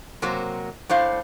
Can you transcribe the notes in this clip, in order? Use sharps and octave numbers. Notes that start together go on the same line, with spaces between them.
C3 F#3 A#3 C5
A2 D4 C5 F5